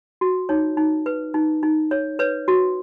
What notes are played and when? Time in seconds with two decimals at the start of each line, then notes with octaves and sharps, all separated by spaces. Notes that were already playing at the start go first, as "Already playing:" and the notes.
0.21 F#4
0.49 D#4 C#5
0.77 D#4
1.06 B4
1.34 D#4
1.63 D#4
1.91 C#5
2.19 B4 C#5
2.48 F#4